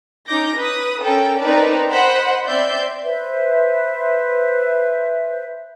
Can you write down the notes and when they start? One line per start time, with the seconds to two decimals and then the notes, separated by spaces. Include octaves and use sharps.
0.27 C#4 D#4 D6 G6 A#6
0.57 B4 D#6
1.02 C#4 A4 A#4 G5
1.39 C4 D#4 A#4 B4 D5 A5
1.90 C5 D#5 F#5 B5
2.45 C4 D5 E5 C6 G6
3.03 B4 C5 E5